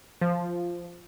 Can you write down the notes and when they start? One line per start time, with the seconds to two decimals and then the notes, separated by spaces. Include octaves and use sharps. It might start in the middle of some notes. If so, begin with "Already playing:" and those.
0.21 F3